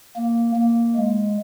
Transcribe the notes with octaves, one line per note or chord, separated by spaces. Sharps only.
A#3
A#3
G#3